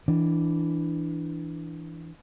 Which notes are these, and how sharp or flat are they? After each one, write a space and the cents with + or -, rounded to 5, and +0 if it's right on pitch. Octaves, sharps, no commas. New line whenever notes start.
E3 +0 D4 +0